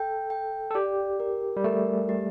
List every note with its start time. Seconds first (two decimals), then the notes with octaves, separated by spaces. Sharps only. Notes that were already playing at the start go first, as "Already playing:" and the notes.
Already playing: A4 G5
0.30 G5
0.71 A4
0.75 G4 D5
1.20 A#4
1.57 G3
1.64 A3 A#4
2.09 G4